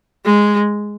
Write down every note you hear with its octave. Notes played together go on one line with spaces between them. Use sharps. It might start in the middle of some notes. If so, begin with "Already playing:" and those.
G#3